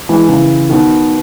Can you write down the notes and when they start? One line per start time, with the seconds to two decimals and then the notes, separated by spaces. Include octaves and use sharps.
0.09 E3 G#3
0.29 C#3 E3
0.69 B2 D#3